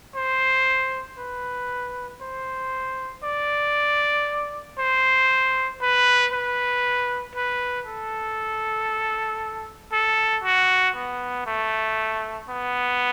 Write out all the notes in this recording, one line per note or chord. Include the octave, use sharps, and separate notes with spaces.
C5
B4
C5
D5
C5
B4
B4
B4
A4
A4
F#4
B3
A3
B3